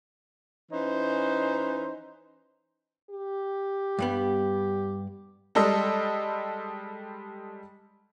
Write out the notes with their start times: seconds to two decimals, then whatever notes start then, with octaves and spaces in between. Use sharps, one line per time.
0.72 E3 C#4 D#4 C5
3.10 G4
3.99 G2 G3 B3
5.55 G3 G#3 A4 D#5 E6